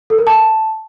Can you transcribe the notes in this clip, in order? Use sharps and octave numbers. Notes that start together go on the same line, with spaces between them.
A4
A#4
A5